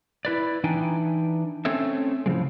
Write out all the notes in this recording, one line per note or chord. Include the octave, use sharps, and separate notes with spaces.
E4 B4 D5
E3 D4 D#4 G5 G#5
A3 C4 C#4 A4 C#5 E5
A2 C#3 F3 G#3